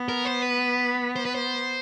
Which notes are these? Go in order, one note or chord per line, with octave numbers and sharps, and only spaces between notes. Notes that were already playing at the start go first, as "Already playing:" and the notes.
Already playing: B3
A#4
C5
B4
C5
B4
C5